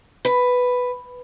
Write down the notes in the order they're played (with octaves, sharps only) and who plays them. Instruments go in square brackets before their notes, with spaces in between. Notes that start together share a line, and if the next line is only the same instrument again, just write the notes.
[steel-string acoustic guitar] B4